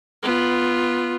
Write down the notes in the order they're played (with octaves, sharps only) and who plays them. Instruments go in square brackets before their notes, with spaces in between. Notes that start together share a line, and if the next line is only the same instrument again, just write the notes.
[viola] B3 F4